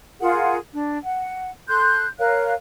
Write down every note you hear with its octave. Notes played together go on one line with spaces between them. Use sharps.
F4 G#4 A#4 F#5
D4
F#5
A4 C6 F#6 G6
A#4 C#5 F5 F#6